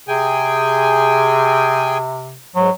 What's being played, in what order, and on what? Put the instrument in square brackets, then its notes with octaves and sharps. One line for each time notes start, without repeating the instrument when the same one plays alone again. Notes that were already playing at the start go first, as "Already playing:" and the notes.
[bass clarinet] C3 [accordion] G#4 G5 G#5
[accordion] G#2 [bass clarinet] F#3